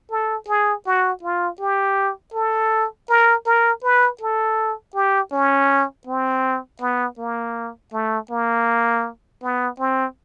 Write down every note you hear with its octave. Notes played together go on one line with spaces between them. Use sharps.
A4
G#4
F#4
F4
G4
A4
A#4
A#4
B4
A4
G4
C#4
C4
B3
A#3
A3
A#3
B3
C4